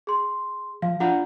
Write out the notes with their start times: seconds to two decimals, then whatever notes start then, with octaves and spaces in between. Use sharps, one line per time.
0.07 G#4 C6
0.82 F3 F5
1.00 D4 F4 F#5 A#5